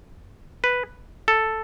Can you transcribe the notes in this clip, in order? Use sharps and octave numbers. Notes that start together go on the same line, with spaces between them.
B4
A4